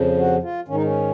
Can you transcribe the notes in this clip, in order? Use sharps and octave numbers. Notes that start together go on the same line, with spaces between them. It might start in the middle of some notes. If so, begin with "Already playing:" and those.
Already playing: F2 C#3 F3
F#4
F4
G#2 D#3 C#4
D#4
C#4